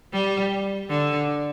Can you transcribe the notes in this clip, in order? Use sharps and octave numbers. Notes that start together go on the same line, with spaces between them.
G3
D3